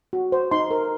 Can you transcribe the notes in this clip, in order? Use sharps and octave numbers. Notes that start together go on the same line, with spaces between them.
F#4
C5
D#4 C6
A#4